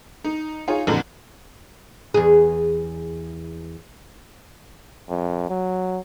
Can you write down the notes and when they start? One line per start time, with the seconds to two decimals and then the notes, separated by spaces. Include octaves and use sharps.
0.24 D#4
0.68 D#4 F4 G#4 C#5
0.87 A1 F2 A#2 D3 A#4 F#7
2.14 E2 G#4
5.09 F2
5.50 F#3